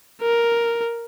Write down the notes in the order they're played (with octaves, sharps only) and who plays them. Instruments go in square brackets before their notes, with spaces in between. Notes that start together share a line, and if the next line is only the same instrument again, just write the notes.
[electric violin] A#4